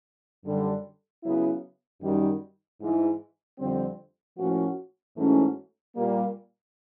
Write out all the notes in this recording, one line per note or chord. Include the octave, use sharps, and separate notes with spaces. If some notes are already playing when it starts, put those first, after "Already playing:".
F#2 D3 G3
C#3 F#3 B3 E4
F#2 D#3 G3
G#2 E3 G#3
F2 D3 G3 C4
A2 F3 A#3 C#4 F#4
G#2 E3 A3 C#4 F#4
A#2 G3 A#3